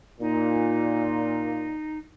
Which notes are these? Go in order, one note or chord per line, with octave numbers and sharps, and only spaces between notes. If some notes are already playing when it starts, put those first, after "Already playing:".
A#2 D#4